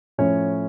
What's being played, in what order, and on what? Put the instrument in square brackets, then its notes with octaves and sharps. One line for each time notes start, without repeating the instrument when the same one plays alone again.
[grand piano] A2 F3 C#4 C#5